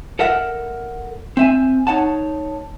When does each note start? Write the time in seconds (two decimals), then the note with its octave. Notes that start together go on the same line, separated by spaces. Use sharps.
0.19 A4 A#4 E5 F#5
1.37 C4 E5 G#5
1.87 D#4 C#5 F#5 A5